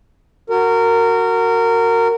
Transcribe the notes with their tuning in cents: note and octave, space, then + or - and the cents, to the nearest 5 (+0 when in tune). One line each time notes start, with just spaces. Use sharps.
F#4 +0 A#4 -20